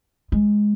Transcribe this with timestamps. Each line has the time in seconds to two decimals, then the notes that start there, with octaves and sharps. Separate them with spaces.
0.32 G#3